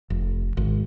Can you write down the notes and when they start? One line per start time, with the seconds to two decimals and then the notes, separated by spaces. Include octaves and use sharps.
0.10 F1
0.57 G#1